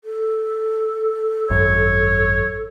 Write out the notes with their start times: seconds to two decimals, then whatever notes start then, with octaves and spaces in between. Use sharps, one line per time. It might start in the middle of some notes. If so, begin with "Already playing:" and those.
0.04 A4
1.50 G#1 F#2 C#5